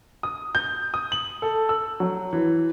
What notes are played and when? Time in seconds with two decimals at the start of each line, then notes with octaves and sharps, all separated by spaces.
0.23 D#6
0.55 G6
0.94 D#6
1.12 F#7
1.42 A4
1.69 E6
2.00 F#3
2.33 E3